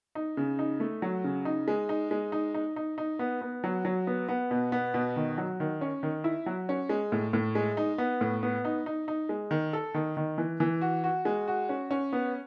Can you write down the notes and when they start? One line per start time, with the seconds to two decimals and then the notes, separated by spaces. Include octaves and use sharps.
0.15 D#4
0.37 C#3
0.59 D#4
0.80 A3
1.02 F#3
1.24 C#3
1.45 D#4
1.68 G#3
1.89 D#4
2.11 G#3
2.32 D#4
2.54 D#4
2.76 D#4
2.98 D#4
3.19 B3
3.42 B3
3.64 F#3
3.85 F#3
4.07 B3
4.29 B3
4.51 B2
4.72 B3
4.94 B2
5.16 D#3
5.38 F#3
5.60 D#3
5.81 C#4
6.03 D#3
6.24 E4
6.46 F#3
6.69 C#4
6.89 G#3
7.12 A2
7.33 A2
7.55 G#3
7.77 D#4
7.98 B3
8.21 A2
8.43 B3
8.65 D#4
8.86 D#4
9.08 D#4
9.29 G#3
9.51 D#3
9.73 A4
9.94 D#3
10.17 D#3
10.38 E3
10.60 E3
10.81 F#4
11.04 F#4
11.25 G#3
11.48 F#4
11.69 C#4
11.91 C#4
12.13 B3